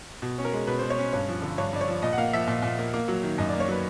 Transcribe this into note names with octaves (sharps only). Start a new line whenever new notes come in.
B2
C#4
A#4
G#3
B2 B4
B2 C5
C#5
C#4
G2 C#5
F3
D3
G2 C#5
G2 D5
C#5
F3
A#2 D#5
F#5
A#3 F5
F3 E5
A#2
A#2
A#3
A#3
F#3
D#3
F#2 D#5
A#3 D5
C#5
F#3 B4